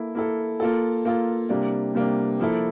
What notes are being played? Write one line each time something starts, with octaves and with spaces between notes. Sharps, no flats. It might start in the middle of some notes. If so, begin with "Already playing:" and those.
Already playing: A#3 E4 A4
A#3 E4 A4
A#3 F4 A4
A#3 F4 A4
C3 G3 A#3 D4
C3 G3 A#3 D4
F3 A#3 E4 A4